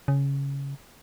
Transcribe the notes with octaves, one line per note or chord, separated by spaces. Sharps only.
C#3